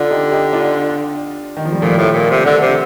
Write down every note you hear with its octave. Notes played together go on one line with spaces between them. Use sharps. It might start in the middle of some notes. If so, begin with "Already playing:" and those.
Already playing: D3 D4 F4
D#4 G4
D#4 G4
D4 F4
D#3
F3
G3
A#2 F3 A3
A2
A#2
C3
D3
C3